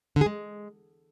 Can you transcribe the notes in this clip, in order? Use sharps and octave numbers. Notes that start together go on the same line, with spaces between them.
D3
G#4
G#3